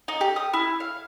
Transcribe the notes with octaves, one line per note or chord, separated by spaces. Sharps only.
D#4
G4
D#6
E4
F5